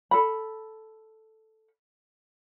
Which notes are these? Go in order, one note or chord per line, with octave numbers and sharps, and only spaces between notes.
A4 B5